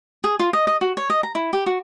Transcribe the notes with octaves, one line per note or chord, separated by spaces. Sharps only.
G#4
F4
D#5
D#5
F#4
C#5
D#5
A#5
E4
G4
F#4